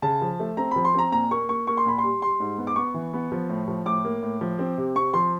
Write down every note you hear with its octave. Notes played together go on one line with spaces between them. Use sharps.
C#3 A5
F3
A3
C4 A#5
F3 B5
C6
C4 A#5
A#2 A#5
A#3 C#6
A#3 C#6
A#3 C#6
C6
A#2 B5
G3 C6
G3 C6
G#2
B3
D6
B3 C#6
E3
B3
F3
A2
F3
A2 D6
A#3
A2
F3
C4
C3
C4 C#6
F3 C6